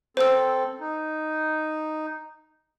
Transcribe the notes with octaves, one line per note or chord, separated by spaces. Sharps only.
C4 A4 C5 E6
D#4